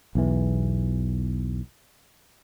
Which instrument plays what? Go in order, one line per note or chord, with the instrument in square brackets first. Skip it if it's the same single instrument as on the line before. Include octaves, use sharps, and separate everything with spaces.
[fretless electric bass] B1 E2 E3